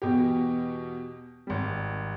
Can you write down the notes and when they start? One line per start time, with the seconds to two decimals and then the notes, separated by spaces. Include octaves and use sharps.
0.02 E2 B2 G4
1.47 G#1 G3